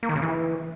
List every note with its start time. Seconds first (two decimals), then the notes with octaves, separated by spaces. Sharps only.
0.03 A#3
0.09 D#3
0.16 C#3
0.22 E3